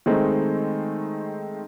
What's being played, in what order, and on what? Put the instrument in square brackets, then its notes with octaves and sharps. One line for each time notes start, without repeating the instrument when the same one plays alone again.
[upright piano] D#3 G#3 A3 C4 D#4